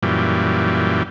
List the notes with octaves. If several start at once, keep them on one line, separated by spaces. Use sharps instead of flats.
F#2 A#2 E3 G3